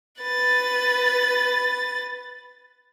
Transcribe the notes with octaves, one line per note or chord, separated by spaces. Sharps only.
B4 A6